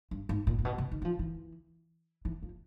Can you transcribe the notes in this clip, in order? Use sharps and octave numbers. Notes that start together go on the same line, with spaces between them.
G2
G#2
A#2
A#2
B2
C3
D#3
F#3
F3
E3
E3
F3